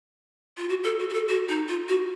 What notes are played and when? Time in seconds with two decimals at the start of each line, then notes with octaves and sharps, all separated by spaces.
0.57 F4
0.69 F#4
0.84 A4
1.00 F#4
1.10 F#4
1.13 A4
1.29 F#4
1.49 D#4
1.68 F4
1.88 F#4